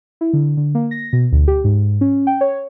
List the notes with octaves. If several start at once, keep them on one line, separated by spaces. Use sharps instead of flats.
E4
D3
D3
A#3
A#6
B2
D2
G4
G#2
C#4
G5
C#5